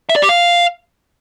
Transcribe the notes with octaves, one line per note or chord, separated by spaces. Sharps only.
E5
D5
G4
F5